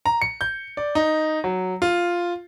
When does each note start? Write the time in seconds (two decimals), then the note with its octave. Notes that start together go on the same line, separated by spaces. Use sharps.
0.05 A#5
0.22 C#7
0.41 G6
0.77 D5
0.95 D#4
1.44 F#3
1.82 F4